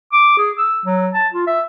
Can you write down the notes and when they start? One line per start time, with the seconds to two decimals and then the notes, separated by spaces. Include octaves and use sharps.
0.13 D6
0.38 G#4
0.58 E6
0.85 F#3
1.14 A5
1.33 F4
1.47 E5